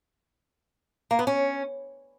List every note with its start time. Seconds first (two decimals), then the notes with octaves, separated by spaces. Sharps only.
1.11 A#3
1.19 B3
1.27 C#4